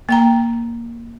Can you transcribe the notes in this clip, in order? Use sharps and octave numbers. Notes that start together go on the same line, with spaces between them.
A#3 G5 A#5